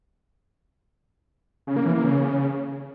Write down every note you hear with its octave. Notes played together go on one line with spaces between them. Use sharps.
C#3
A#3
E3
A#3
C#3